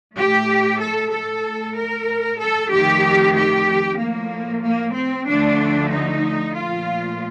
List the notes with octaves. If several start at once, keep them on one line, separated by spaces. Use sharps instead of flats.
A2 A3 G4
A4
A4
A2 A3
A#4
A4
F2 D#3 A3 G4
G4
A2 F3 A3 A#3
A#3
C4
D2 D3 F3 A3 D4
D#4
A#2 F3 A3 F4